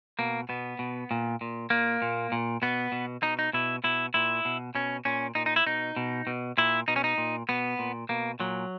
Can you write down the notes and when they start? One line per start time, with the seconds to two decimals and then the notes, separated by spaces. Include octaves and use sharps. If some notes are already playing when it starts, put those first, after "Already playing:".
0.19 B2 A#3
0.49 B2 B3
0.79 B2
1.11 A#2
1.41 A#2
1.70 A#2 A#3
2.02 A#2
2.32 A#2
2.62 B2 B3
2.92 B2
3.23 B2 D#4
3.39 D#4
3.53 B2 E4
3.84 B2 E4
4.14 A#2 E4
4.45 B2
4.75 B2 C#4
5.05 A#2 C#4
5.35 A#2 D#4
5.46 D#4
5.56 E4
5.66 B2 D#4
5.96 B2
6.27 B2
6.58 A#2 E4
6.88 B2 D#4
6.96 C#4
7.04 D#4
7.18 A#2
7.49 B2 B3
7.79 A#2
8.09 B2 A#3
8.40 A#2 F#3